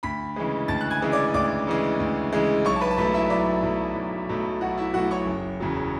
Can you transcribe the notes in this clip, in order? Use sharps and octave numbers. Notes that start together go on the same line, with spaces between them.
D2 B5 B6
C#3 E3 G#3
D2 A5 A6
F#6
G#5 G#6
C#3 E3 G#3
D5 D6
D2 D5 D6
C#3 E3 G#3
D2
C#3 E3 G#3
B1 C#5 C#6
A5
B4 B5
A5
B2 F#3 A3 B4 B5
E4 E5
B1 D5
B2 F#3 A3
B1
B2 F#3 A3
B1 F#4 F#5
E4 E5
B2 F#3 A3 F#4 F#5
C#5 C#6
F#1
E2 C#3 F#3